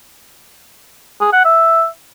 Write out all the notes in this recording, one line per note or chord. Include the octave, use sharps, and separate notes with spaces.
G#4
F#5
E5